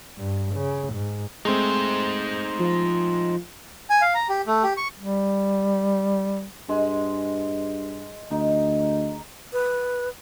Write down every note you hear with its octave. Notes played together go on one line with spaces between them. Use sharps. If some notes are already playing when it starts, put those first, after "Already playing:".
G2
C#3
G#2
G#3 A3 C4 D#4 C5
F3
G#5
F5
A#5
G4
A3
G4
C#6
G3
G2 G#3
D2 D#4
B4